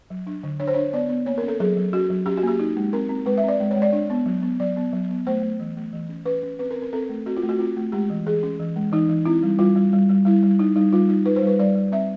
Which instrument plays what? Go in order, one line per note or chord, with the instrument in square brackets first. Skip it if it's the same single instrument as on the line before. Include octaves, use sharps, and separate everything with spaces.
[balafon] F#3
D4
D3
D4 C#5
C5
D4 C#5
B3 D5
B3
A#3 C#5
A#4
C#4
A4
F#3 G#4
F#3
C#4 F#4
F#3
C#4 G4
F#4
A#3 G4
D#4
G#3
C4 A#4
C4
G#3 B4
E5
C4 D5
G#3
C#5
G#3
D5
D4
B3
F#3
B3
F#3 D5
B3
F#3
B3
A3 C5
A3
E3
A3
E3
C#4
C#4 B4
C#4
C4 B4
A#4
C4
A#4
C4 A4
A3
C4 F#4
F4
A3
F#4
C4 F4
A3
G#3 G4
E3
E3 G#4
C#4
E3
G#3
E3 D#4
E3
C4 E4
G3
G3 F4
G3
G3
G3
G3 E4
G3
D#4
G3 D#4
G3 F4
D#4
D#4 B4
C5
G3 B4
G3 D5
G3
C4 E5